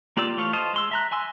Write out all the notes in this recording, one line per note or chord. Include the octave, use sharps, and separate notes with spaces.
A#3 F4 G4 D5 E6
E3 A3 F4 C#5 F5
C5 D#5 F5 A5
G#3 C6 E6
E5 A#5 F#6
E5 G#5 C6 E6